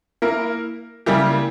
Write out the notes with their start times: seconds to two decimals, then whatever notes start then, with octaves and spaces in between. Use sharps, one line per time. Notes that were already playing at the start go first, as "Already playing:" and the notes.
0.22 A#3 E4 A#4
1.06 C#3 G3 A#3 E4 G4